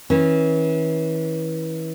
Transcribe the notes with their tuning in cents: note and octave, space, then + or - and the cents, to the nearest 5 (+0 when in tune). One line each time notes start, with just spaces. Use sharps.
E3 -35 C#4 -25